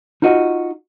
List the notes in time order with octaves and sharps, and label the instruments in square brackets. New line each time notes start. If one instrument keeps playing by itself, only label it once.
[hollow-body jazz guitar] D#4 F4 F#4 D#5